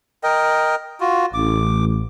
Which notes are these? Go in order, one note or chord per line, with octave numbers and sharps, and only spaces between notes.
A#4 D#5 G5
F4 F#4
A1 D6